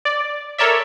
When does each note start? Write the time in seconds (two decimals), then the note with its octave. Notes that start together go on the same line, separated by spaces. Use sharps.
0.05 D5
0.58 A4 A#4 C#5 D5 E5